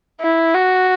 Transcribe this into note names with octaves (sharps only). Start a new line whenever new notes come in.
E4
F#4